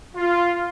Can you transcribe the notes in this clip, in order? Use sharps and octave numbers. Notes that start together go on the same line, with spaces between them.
F4